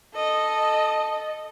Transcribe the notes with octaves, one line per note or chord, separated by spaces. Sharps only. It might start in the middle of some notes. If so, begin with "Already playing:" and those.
A4 D#5